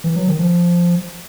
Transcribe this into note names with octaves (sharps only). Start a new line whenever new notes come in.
E3
F#3
D#3
F3